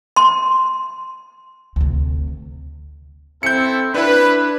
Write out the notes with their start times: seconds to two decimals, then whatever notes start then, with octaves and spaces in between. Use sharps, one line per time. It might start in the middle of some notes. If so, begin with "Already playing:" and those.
0.16 C6
1.76 D2 C3
3.43 C4 E4 A4 G6 C#7
3.94 D4 E4 B4